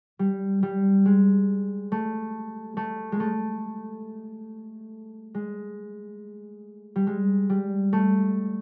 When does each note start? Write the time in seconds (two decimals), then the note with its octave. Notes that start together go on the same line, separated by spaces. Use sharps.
0.19 G3
0.63 G3
1.06 G#3
1.92 A3
2.77 A3
3.12 G#3
3.20 A3
5.35 G#3
6.96 G3
7.07 G#3
7.50 G3
7.93 A3